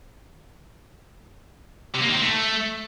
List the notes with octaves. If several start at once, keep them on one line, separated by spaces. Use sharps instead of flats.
C3
A#3
D#3
C4
A3